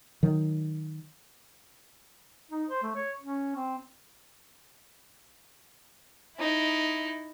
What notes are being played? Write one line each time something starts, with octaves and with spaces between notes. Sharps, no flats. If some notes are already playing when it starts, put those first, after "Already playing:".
D#3 F#3
D#4
C5
A3
C#5
C#4
C4
D#4 E4